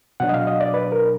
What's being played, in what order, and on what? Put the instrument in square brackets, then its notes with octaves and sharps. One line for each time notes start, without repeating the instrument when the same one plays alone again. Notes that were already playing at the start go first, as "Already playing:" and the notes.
[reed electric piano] B2 F#3 D4 F#5
D#5
F5
D#5
D5
B4
A#4